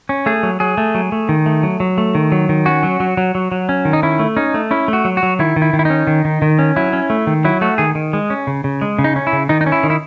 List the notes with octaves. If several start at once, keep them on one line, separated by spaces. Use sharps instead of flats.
C#4
A3 G#4
F#3
F#3 G#4
A3
F#3
A3
D#3
A3
F#3
F#3
A3
D#3
F#3
D#3
C#4 F#4
F#3
F#3
F#3
F#3
F#3
C#4
D#3
D#4
C#4 E4
A3
C#4 D#4
A3
C#4 E4
A3
F#4
F#3
F#4
F#3
D#3 E4
D#3
E4
D#3
E4
C#4 D#4
D#3
D#3
D#3
C#4
F#3 E4
C#4
A3
D#3
F#3 E4
A3 F#4
D#3 G#4
D#3
G#3
C#4
C#3
C#3
G#3
C#3
D#4
C#4
E4
C#3
D#3 D#4
D#4
C#4
E4
D#3
E4